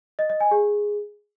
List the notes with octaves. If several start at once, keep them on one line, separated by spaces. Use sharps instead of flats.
D#5
D#5
G#5
G#4